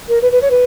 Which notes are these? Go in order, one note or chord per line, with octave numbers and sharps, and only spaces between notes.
A#4
B4
B4
C#5
B4